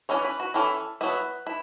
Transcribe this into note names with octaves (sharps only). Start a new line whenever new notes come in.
E3 C#4 E4 C#5
B4
F#4
E3 C#4 E4 A4
F#3 B3 E4 B4
E4